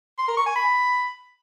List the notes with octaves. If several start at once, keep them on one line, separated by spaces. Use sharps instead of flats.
C6
A#4
C#6
G#5
B5